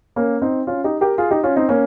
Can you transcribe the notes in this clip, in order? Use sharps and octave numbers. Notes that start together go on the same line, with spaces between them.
A#3 C#4
C4 D#4
C#4 F4
D#4 G4
G4 A#4
F4 G#4
D#4 G4
C#4 F4
C4 D#4
A#3 C#4